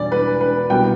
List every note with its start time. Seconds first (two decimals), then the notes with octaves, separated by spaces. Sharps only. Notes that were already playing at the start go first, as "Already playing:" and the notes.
Already playing: E2 B2 G3 D5
0.12 B4
0.41 B4
0.70 C2 B2 B3 G5